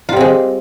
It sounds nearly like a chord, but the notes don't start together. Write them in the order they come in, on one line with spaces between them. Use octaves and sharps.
F4 G3 C4 G#3